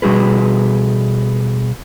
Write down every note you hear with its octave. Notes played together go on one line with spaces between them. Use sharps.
B2 G3 F#4 G#4 B4